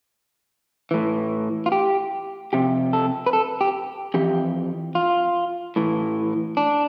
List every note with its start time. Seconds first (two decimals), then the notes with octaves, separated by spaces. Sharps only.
0.91 A2 E3
1.66 F4
1.72 G4
2.53 F2 C3 G4
2.93 A4
3.26 B4
3.33 A4
3.61 G4
4.14 F2 E3 G4
4.95 F4
5.76 A2 E3
6.57 D4